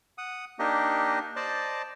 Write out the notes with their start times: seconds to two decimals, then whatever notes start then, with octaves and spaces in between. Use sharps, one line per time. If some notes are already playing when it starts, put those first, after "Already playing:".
0.18 F#5 D#6
0.59 A#3 D4 D#4 G4 D#5
1.36 C5 D5 D#5 A5